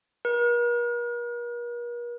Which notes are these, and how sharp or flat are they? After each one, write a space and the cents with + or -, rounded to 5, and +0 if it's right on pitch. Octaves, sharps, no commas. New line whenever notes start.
A#4 +45